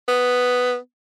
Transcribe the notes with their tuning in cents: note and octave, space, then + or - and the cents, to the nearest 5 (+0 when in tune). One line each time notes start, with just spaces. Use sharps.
B3 +5